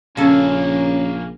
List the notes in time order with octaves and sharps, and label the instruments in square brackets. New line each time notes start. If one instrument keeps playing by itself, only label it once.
[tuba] A#1 [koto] C#3 A4 [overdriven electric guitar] A#3 G#4 [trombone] C#4